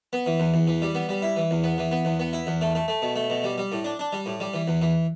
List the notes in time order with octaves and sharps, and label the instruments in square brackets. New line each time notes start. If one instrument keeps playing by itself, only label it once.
[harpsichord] B3
E3
E2
E2
E3
G3
B3
G3
E4
E3
E2
B3
E3
B3
E2
B3
E4
E2
A3
A3
A3
B2
A3
B2
G3
G3
A2
D4
D4
G3
A2
G3
E3
E2
E3